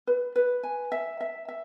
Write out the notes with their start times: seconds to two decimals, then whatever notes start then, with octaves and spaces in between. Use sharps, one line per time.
0.07 B4
0.36 B4
0.63 G#5
0.92 E5
1.21 E5
1.48 E5